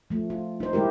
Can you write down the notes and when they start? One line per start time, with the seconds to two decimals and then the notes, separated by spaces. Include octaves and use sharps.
0.10 F3 A3
0.30 F4
0.60 D#4 C5
0.73 D3 G#3 E4 G4 A#4